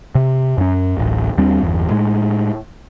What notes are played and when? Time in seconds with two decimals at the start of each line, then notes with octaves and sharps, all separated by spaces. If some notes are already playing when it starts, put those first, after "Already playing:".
0.15 C3
0.58 F#2 C#4
0.97 D1 A1 E2
1.37 D#2 G3 C4 D4
1.61 G1 E2
1.90 A2 G#3